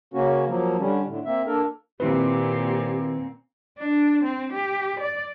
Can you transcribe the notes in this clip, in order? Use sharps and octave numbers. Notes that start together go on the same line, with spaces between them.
C#3 A#3 C#4 F#4
F3 F#3 A#3
D3 G3 C#4
A2 D3
A#3 C4 E5
A#3 D4 A4 A#4
A#2 D#3 C4 E4 G4 B4
D4
C4
G4
D5